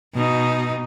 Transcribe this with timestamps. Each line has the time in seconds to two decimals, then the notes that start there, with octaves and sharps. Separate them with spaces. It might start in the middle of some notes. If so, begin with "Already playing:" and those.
0.15 B2 D#4